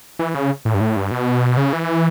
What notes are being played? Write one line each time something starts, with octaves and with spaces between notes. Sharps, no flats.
E3
C#3
A2
G2
A2
G2
B2
C#3
E3